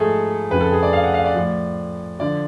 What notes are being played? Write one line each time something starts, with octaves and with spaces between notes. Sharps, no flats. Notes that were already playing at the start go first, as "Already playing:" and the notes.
Already playing: G#2 F3 A3 G#4 A4
F2 C#3 F3 B4
A4
G#4
D5
F5
F#5
F5
D5
A2 F3
D3 F3 D5